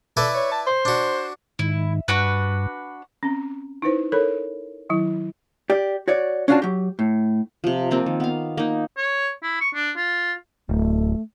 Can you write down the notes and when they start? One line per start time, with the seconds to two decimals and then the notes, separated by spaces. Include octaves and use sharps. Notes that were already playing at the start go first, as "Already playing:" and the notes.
0.17 E4 A4 B4 D5
0.35 C#5
0.51 A5
0.67 C5
0.85 D4 F#4
1.59 G#2 D#3 E4
2.08 G2 D4 F#4 B4
3.23 C4 C#4
3.82 D#4 E4 B4 C5
4.12 A4 A#4 C#5 B5
4.90 D#3 F#3 E4
5.70 G4 D5
6.08 F#4 C#5 D5
6.48 C#4 D4 F4 F#4 D5 A5
6.62 F#3 G4
6.99 A2
7.64 C3 F3
7.91 F3 A#3 C4 F4
8.06 D#3
8.20 B3 F5
8.57 A#3 D#4
8.97 C#5
9.43 E4
9.61 C#6
9.74 D4
9.96 F4
10.69 D1 A3